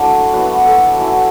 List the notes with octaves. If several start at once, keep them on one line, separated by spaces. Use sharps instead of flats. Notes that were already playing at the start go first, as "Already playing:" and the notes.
Already playing: F#3 A3 D4 E4 B4 C#5
F#3 B3 E4 B4
A4
F#3 C#4 E4